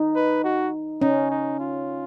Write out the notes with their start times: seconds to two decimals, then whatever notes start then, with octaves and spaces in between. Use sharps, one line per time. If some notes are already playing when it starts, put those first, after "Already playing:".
Already playing: D#4
0.15 B4
0.44 F#4
1.02 C#4 D#4
1.30 D#4
1.60 F4